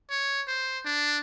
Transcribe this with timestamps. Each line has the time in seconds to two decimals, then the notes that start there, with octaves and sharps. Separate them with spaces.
0.10 C#5
0.48 C5
0.85 D4